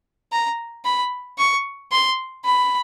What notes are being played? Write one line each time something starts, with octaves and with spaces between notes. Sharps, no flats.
A#5
B5
C#6
C6
B5